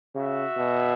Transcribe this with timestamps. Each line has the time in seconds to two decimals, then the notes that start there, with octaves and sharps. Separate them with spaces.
0.15 C#3 F#4 E5
0.57 B2